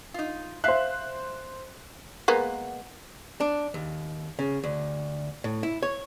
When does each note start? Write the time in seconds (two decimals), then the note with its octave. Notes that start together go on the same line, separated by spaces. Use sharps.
0.14 D#4 F4
0.64 C5 E5 F5 F#6
2.28 G#3 A#3 B3
3.40 D4
3.74 D#2
4.39 C#3
4.64 D2
5.44 A2
5.63 E4
5.83 C#5